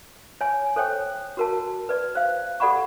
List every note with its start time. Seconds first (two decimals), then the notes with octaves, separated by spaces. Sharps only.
0.41 C#5 G#5
0.76 A4 C5 C#5 G5
1.37 F#4 A#4 A5
1.89 B4 D5
2.15 C5 F5
2.60 G4 A4 D5 F#5 B5 C#6